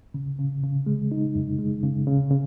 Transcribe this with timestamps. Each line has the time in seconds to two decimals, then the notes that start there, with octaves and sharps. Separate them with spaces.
0.14 C#3
0.39 C#3
0.63 C#3
0.86 G#3
1.12 D#4
1.35 F#2
1.59 G#3
1.83 C#3
2.07 C#3
2.31 C#3